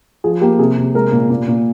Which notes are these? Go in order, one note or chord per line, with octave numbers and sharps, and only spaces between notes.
F3 G#4
A#3 G4
C3 G#4
C3
G#3 A#4
A#2
A#2
A#2